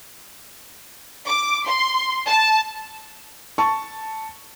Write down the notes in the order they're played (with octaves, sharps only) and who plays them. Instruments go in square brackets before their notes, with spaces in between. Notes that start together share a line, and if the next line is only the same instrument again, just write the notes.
[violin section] D6
C6
A5
[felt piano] A5 C#6